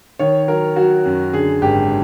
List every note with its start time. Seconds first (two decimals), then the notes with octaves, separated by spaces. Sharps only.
0.19 D#3 C#5
0.48 F#3 A#4
0.76 F#3 F#4
1.05 F#2
1.33 D3 G#4
1.62 G#1 G4